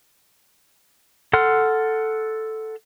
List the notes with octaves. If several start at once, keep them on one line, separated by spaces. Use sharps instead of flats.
A4 F#5 C6 F6